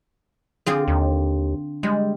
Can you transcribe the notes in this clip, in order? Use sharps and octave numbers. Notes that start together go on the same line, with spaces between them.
D3 C4 F4 G#4
D#2
G3 G#3